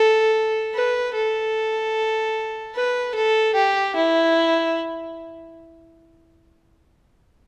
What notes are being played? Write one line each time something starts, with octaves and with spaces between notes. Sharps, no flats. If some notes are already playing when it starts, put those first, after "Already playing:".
Already playing: A4
B4
A4
B4
A4
G4
E4